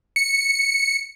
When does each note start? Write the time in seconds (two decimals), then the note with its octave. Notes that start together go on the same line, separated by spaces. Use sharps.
0.16 C#7